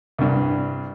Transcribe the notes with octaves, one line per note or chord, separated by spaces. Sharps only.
C2 G2